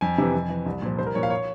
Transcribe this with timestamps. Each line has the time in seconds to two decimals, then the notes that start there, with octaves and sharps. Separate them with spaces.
0.01 F2 G#5
0.18 C3 E3
0.34 F2
0.49 E3
0.66 C2
0.82 A#2 F3
0.98 C2 C5
1.06 A#4
1.15 A#2 F3 C#5
1.23 F5
1.30 C#5